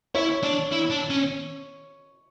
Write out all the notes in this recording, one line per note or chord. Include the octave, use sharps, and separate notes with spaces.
E4 C#5
D4
E4
D4
C#4